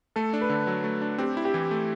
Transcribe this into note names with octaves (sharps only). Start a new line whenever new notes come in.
A3 A4
D4
B4
D3
F#3
A3
D4
C4 G4
E4
G4
E3
A3